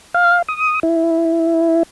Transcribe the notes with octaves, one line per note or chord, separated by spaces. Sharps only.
F5
D#6
E4